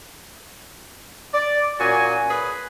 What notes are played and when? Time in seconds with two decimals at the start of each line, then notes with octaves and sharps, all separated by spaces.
1.34 D5
1.80 A#2 C#4 F#4 G#5
2.30 G#4 B4